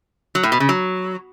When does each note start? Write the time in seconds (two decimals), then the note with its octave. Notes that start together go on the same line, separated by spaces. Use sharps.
0.35 F#3
0.43 A2
0.52 B2
0.60 C#3
0.69 F#3